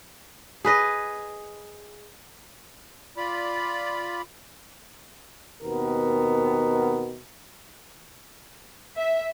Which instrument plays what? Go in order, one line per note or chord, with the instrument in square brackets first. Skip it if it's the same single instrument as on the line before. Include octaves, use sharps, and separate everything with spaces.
[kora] G#4 B4 D#5
[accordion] F4 D5 B5
[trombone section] D#2 B2 B3 C4 A#4
[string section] E5